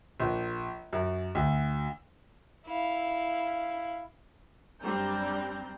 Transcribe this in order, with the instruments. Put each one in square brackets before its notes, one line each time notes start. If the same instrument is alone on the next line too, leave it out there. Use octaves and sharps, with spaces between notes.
[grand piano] A#1
F#2
D2
[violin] E4 F5
[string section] F#2 G3 C4 D4 A#5 G6